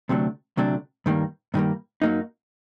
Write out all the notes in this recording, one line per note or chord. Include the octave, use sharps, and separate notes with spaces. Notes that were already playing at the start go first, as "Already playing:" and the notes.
D2 C3 F#3 A3 D4
D2 C3 F#3 A3 D4
G2 D#3 G3 A#3
G2 D#3 G3 A#3
F#2 F#3 A#3 D#4